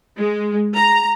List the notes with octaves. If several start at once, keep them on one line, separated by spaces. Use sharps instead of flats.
G#3
A#5